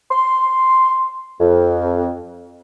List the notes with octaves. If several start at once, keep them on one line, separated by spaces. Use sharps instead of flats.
C6
F2